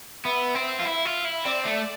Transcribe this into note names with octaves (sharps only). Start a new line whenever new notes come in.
B3 E5
C4
F4
E4
F4
E4
C4 D5
A3